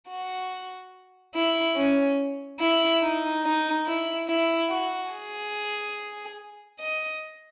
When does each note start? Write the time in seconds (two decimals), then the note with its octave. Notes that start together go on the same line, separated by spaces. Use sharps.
0.09 F#4
1.35 E4
1.76 C#4
2.59 E4
3.02 D#4
3.43 D#4
3.86 E4
4.27 E4
4.69 F#4
5.11 G#4
6.79 D#5